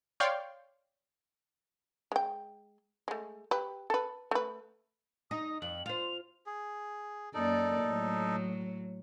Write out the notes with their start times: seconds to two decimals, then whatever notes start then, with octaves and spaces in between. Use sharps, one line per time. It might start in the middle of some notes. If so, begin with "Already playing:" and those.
0.20 C#5 D5 F5 G5 C6
2.12 G#3 G5
3.08 G#3 A3
3.51 G4 B4
3.90 A4 B4
4.31 A3 B4
5.31 D#4 D#6
5.62 F2 F#7
5.86 F4 C5 F7
6.46 G#4
7.34 F#2 A#3 D#4 A4 D5
7.84 A2 F#3